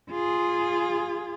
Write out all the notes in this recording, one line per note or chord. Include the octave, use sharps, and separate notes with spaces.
F4 G#4